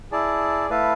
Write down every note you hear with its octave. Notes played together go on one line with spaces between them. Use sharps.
E4 G#4 D5 A5
A3 E4 B4 F5 A5